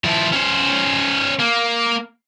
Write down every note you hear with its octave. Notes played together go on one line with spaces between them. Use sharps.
F3 E4
C#4 C5
A#3